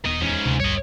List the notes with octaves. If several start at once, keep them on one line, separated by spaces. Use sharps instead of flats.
D#1 D#3 B3 D#5
E2 G#2 C#4
D2 C3
A#1 G2 G3 C#5 D#5